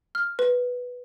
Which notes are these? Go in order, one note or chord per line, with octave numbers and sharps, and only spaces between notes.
F6
B4